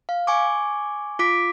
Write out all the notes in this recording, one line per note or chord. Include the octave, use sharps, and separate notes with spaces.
F5
G#5 C#6 D6
F4 D6 B6 D7